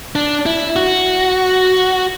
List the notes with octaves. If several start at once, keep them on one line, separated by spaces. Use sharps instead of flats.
D4
E4
F#4